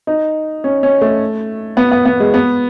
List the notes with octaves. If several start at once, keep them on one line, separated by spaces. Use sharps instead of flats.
D#4
C#4
C#4
A3
B3
B3
B3
G#3
B3